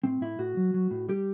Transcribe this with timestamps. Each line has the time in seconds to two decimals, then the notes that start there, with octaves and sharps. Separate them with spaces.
0.04 A2 C4
0.21 A2 E4
0.39 A2 F#4
0.57 F#3
0.74 F#3
0.91 A2
1.09 G3 G4